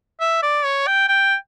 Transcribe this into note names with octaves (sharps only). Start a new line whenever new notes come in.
E5
D5
C#5
G5
G5